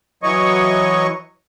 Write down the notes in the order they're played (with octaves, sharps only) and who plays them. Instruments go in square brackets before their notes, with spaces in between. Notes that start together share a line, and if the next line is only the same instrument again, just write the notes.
[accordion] E3 F#3 C#5 D#5 C#6